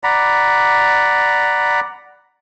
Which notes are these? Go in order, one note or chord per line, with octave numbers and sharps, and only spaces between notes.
D5 F#5 A#5 B5